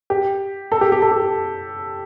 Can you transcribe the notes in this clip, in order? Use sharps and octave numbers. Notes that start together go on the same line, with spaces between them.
G4
A4
G4
G4
A4
G4